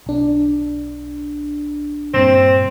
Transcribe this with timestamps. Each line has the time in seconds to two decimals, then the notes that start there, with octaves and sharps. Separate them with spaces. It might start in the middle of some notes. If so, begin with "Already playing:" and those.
0.06 B1 D4
2.14 G2 A#2 C4